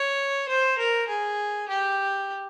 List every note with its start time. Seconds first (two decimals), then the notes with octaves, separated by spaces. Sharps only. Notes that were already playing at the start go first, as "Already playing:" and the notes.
Already playing: C#5
0.49 C5
0.79 A#4
1.08 G#4
1.69 G4